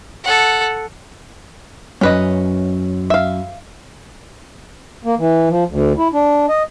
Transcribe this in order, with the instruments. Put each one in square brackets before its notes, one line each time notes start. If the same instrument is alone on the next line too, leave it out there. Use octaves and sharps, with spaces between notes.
[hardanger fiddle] A4 F#5
[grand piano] F#2 [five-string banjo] C#4 B4 D#5
[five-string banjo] E5 F5
[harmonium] A#3
E3
F3
D2
E4
D4
D#5